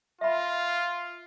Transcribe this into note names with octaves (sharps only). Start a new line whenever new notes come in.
F4 E5 B5